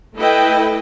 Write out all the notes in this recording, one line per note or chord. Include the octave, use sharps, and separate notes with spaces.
A3 E4 A4 B4 D#5 G5